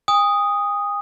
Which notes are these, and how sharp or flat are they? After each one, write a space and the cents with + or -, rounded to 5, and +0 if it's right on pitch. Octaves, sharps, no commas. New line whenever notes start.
G#5 -45 D#6 +0